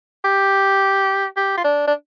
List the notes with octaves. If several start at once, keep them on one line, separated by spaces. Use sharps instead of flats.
G4
G4
F4
D4
D4